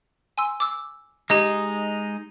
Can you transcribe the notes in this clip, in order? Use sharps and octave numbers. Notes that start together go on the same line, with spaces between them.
G#5 C6 E6
D6 E6
G#3 D#4 G4 D#5